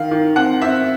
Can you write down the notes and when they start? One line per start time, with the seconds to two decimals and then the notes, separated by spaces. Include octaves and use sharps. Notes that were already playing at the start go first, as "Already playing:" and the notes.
Already playing: D#3 F5
0.11 D#3
0.36 C4 F#5
0.61 C4 E5